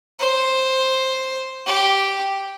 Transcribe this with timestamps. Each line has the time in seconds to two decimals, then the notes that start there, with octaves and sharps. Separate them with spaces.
0.20 C5
1.66 G4